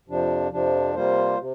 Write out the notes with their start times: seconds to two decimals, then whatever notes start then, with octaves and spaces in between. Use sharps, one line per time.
0.08 F2 C3 F3 D4
0.52 F2 C3 F3 D4
0.95 C3 G3 A#3 F4 C5
1.38 C3